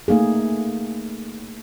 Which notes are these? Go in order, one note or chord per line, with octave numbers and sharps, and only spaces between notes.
A3 A#3 D#4 G#4